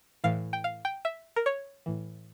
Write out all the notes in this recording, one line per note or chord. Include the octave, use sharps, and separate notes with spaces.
A2 E3 F5
G5
F5
G5
E5
A#4
C#5
A2 E3